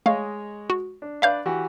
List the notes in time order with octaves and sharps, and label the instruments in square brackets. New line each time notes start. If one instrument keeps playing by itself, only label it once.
[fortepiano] G#3 C#5 D#5 [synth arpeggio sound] A3 F5
[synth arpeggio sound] F#4
[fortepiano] D4
[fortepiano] D4 B4 D5 [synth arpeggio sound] E5 F5 G6
[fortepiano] E3 F#4 G4